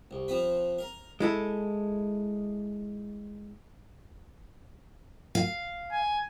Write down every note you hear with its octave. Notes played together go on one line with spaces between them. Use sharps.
C2
F3 C4 B4
A#4
G#3 E4 A4
F5
G#5